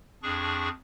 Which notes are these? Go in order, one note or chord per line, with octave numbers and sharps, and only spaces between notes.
F2 D4 G#4 C#6